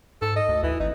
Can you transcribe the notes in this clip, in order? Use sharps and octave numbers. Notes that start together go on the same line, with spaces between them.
G#2 A4
D#5
D2
D2 E3
G#1 D#4